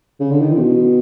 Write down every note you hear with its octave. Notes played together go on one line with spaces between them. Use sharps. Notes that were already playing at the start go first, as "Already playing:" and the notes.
C#3
D3
D#3
E3
C3
B2